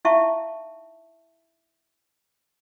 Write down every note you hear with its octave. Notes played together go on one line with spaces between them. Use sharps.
D#4 E4 E5 F5 A5 C#6